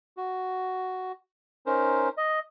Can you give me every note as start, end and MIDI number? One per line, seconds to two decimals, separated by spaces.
0.17 1.12 66
1.66 2.09 61
1.66 2.09 63
1.66 2.09 70
1.66 2.09 72
2.17 2.39 75